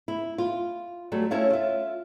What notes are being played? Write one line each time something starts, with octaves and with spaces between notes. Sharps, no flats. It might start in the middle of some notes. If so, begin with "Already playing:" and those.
E4
F4
F#3 G3 A3
A3 C#4 E4 A4 C#5 F5
F4 E5